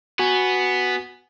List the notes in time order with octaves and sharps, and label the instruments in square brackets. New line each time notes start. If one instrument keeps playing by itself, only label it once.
[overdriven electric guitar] B3 [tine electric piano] F#4 G#5